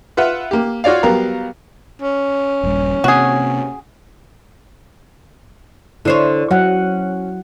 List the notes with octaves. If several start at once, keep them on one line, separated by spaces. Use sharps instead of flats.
F4 B4 E5 F#5
A#3 G4
F4 F#4 C#5 D5 F5
F#3 G3 B3 A#4 F5 A#5
C#4
D#1 G2 G3
C3 A#3 C4 F#4 G#4
D3 E4 C5 C#5
F#3 C#4 F#5